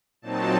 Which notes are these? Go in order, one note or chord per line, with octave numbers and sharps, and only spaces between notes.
A#2 F#3 C4 D#4 A5